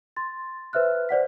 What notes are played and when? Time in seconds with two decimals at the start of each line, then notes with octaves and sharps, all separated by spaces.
0.16 C6 A6
0.73 B4 C5 E5 F6 F#6
1.09 C5 D5 F#5 B6